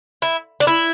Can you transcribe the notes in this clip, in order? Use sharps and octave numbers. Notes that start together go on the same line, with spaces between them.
E4
D4
E4